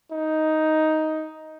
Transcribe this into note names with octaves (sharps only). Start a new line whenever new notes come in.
D#4